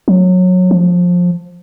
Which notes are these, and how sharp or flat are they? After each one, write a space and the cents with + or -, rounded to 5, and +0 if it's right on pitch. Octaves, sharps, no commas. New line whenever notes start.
F#3 -20
F3 +20